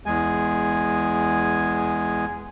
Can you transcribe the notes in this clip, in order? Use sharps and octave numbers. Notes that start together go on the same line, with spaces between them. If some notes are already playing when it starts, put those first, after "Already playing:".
E2 G#3 G#5